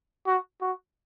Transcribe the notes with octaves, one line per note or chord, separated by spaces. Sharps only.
F#4
F#4